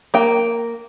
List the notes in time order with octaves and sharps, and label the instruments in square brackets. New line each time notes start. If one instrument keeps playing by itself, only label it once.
[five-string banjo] A#3 G5